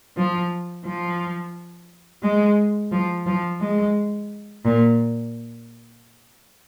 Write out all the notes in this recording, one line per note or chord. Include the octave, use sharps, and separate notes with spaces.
F3
F3
G#3
F3
F3
G#3
A#2